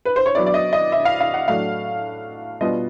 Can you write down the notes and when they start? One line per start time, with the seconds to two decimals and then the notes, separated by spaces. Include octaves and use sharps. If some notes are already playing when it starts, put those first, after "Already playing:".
0.05 B4
0.16 C5
0.26 C#5
0.35 F#3 B3 E4 D5
0.46 D5
0.54 D#5
0.73 D#5
0.92 E5
1.05 F5
1.20 F5
1.34 F#5
1.48 A2 F#3 A3 D4 F5
2.61 B2 G3 B3 D4 F4 D#5